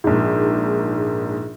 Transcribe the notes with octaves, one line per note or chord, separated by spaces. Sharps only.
A#1 G#2